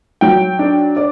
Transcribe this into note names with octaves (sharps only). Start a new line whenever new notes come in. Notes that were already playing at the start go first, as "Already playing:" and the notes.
F#3 G5
D4
D5